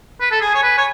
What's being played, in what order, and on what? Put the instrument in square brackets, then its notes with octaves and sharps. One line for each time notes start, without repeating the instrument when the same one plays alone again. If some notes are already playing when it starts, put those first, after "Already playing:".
[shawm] B4
A4
[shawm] G#4 [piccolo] G#5
[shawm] C#5
B4
C#5